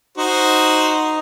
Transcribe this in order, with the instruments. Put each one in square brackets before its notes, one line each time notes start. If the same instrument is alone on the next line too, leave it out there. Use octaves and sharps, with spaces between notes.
[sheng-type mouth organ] D#4 [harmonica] F#4 C5